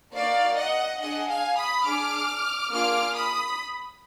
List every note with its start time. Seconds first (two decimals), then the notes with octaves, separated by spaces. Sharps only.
0.14 A#3 D#4 F#4 D5 F5
0.58 D#5 F#5
1.00 D4 G#4 D#5 F#5
1.29 F5 G#5
1.57 B5 D#6
1.85 D4 G#4 D6 F6
2.71 A#3 D4 F4 G#4 D6 F6
3.15 B5 D#6